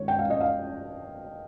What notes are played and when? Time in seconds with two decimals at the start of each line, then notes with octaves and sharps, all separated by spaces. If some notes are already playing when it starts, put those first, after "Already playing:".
Already playing: D#3 G#3 C#5
0.08 G5
0.19 F5
0.30 D#5
0.41 F5